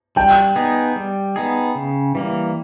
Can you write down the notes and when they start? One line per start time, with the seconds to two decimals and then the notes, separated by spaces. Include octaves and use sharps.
0.16 G3 G5
0.56 B3 D#4 G#4
0.96 G3
1.36 B3 D#4 G#4
1.75 C#3
2.15 E3 G3 A#3